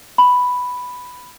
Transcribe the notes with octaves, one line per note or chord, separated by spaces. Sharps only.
B5